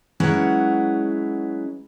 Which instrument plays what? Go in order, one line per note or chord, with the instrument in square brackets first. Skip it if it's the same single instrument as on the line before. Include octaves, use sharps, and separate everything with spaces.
[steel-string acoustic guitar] F#3 G#3 C#4 E4 B4 F#5